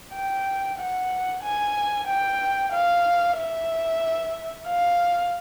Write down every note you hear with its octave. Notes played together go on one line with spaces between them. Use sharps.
G5
F#5
G#5
G5
F5
E5
F5